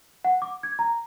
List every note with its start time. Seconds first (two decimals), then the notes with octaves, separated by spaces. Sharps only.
0.24 F#5
0.42 D6
0.63 G#6
0.79 A#5